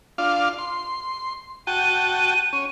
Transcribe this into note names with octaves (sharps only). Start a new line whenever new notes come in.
D4 F4 F5
C6
F#4 G5 A5 D#7
C#4